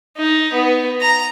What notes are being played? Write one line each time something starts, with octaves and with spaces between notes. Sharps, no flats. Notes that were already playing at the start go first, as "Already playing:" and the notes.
D#4
B3
A#5